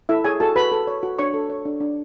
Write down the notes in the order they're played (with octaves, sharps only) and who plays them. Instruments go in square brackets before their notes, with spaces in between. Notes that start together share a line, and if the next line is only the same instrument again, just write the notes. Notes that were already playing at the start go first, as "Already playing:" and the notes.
[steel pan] E4 A4 E5
G#4 C#5 G#5
F#4 A4 A5
F#4 B4 B5
A4
C#5
F#4
D4 C#5 C#6
A4
C#5
D4
D4